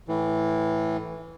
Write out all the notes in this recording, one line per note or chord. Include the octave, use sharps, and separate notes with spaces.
A2 E3